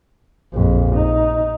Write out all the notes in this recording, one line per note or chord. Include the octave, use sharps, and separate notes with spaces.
A#1 F2
D#4